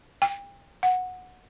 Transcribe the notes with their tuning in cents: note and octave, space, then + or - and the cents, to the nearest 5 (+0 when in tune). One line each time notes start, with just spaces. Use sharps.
G5 +30
F#5 -10